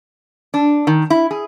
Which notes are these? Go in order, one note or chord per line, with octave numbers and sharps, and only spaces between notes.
D4
D#3
E4
G#4